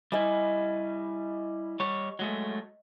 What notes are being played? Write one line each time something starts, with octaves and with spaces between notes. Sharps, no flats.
G3 E4 D#5 G#5
G3 C#5
F#3 G#3 A3